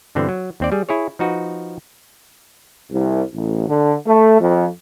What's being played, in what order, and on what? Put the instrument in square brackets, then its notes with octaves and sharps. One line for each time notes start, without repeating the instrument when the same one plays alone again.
[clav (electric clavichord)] G2 B2 D3 E3 C4
F#3
D#2 C4 D5
G3 G#4
E4 G#4 C#5
F3 D#4 F#4 B4
[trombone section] C2
A1
D3
A3
F2